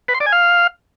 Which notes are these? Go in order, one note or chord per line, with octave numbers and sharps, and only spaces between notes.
B4
C6
D5
G#5
F5